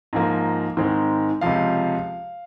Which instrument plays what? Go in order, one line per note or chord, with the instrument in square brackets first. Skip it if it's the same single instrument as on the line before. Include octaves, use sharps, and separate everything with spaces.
[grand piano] G#2 F3 A#3
G#2 D#3 G#3 C4
C#2 C3 F3 F5